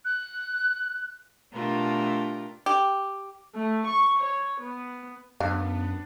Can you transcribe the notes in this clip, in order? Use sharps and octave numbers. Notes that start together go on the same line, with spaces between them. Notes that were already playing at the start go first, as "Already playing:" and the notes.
F#6
B2 A3 D4 F4 G4 A#4
G4
A3
C#6
C#5
B3
F#2 B3 D4 F5